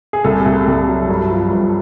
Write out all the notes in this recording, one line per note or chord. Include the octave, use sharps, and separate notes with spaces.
G#4
C2 A4
C2
C2
F#3
G2
F3
G2